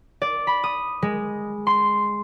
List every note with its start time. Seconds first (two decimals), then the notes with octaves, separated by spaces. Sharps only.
0.22 D5
0.47 B5
0.64 D#6
1.02 G#3
1.67 C6